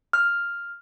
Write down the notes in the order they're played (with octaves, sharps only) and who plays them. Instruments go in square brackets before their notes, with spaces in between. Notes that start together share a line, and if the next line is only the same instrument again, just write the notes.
[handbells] F6